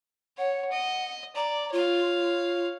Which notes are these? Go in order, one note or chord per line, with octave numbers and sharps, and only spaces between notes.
C#5 F#5
D#5
D5 A#5
F4 C#5 F5